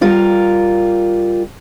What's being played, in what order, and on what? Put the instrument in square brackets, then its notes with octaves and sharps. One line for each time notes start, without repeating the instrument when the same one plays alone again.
[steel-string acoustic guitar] G3 F4 A#4